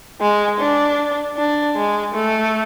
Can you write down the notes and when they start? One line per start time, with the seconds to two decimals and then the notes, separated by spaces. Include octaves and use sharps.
0.21 G#3
0.60 D4
1.37 D4
1.76 G#3
2.15 A3